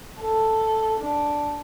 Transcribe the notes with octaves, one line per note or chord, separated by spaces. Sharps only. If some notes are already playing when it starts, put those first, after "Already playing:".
A4
D4